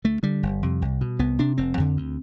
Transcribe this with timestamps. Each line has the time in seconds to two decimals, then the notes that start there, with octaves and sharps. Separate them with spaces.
0.04 D2 A3
0.23 D3 G3
0.43 G1
0.63 F2 C3
0.82 C2
1.01 B2
1.19 C2 B3
1.39 C3 D4
1.58 F1 C4
1.77 F2 D3
1.97 D2